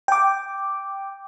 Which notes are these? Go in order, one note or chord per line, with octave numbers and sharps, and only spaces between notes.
G5 D6